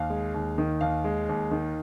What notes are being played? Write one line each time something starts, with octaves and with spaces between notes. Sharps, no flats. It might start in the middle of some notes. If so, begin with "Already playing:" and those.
Already playing: D#2 F5
G#3
D#2
D#3
D#2 F5
G#3
D#2
D#3